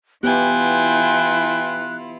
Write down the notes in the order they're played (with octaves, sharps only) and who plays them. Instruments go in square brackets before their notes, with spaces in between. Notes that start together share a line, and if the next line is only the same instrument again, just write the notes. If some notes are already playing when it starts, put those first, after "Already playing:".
[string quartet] E3 E4 F4 [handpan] B3 G4 [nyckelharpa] G5 G#5 [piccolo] F#6